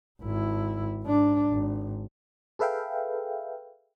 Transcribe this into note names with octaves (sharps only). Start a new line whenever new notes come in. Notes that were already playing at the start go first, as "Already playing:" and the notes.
G#1 E4
G#2 D4
G#1
G#4 A4 B4 E5 F5 G5